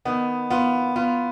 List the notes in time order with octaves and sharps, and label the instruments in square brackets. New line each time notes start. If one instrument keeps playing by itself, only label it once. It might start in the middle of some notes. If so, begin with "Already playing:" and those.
[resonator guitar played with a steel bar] D#3 [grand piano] B3
[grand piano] B3 [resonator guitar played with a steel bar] F4
[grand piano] B3 [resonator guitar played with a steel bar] F4